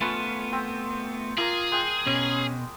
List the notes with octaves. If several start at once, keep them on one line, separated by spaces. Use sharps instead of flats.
A3 B3 C#4 F4 B4
C4 G5
A#3 F4 G#4 A#5 D#6
G#3 G5
B2 C#4